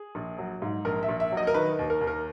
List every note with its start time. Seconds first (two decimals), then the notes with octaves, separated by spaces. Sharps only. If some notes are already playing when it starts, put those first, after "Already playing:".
Already playing: G#4
0.15 A#1
0.38 F#3
0.62 G#2
0.85 A#1 A#4
1.03 E5
1.09 A#1
1.20 E5
1.32 F#3 D#5
1.47 A#4
1.54 D#3 B4
1.79 D#2
1.90 A#4
2.01 D#2
2.07 A#4